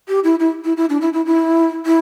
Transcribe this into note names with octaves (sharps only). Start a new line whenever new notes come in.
G4
E4
E4
E4
E4
D4
E4
E4
E4
E4